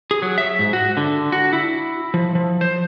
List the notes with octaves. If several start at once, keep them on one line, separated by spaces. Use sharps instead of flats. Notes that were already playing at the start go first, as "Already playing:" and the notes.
G#4
F#3
E5
G#2
F#4
D3
F#4
E4
F3
F3
C5